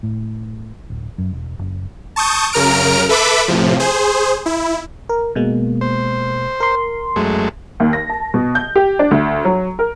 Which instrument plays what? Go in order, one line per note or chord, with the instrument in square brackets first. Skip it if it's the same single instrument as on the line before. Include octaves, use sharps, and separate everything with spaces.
[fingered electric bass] A2
D1
F#2
E1
F#1
[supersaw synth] A5 C#6 D#6 G6
F#2 C#3 A#4 A#5 F6 D7
A4 B4 E5 B5 D6
A2 C3 F3
G#4 C5
E4
[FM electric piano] A#4
B2 G#3 A#3
[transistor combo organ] C5
[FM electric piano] A#4 C6
[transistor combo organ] F#2 G#3 A3
[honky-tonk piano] D#2
A#6
A5
B2
G6
G4
D4
D2
F#3
A#4